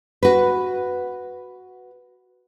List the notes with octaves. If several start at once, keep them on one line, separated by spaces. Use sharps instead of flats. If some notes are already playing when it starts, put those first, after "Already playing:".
F#4 B4